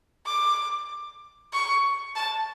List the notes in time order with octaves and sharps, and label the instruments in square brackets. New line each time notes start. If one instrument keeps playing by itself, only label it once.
[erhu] D6
C#6
A5